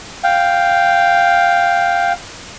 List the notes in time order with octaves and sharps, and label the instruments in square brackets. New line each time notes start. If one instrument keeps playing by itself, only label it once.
[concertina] F5 G5